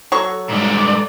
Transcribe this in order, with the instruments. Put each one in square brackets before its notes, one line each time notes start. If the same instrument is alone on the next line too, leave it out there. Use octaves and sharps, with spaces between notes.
[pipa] F#3 C#6 [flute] A4
[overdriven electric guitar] G#2 G3 [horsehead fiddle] D5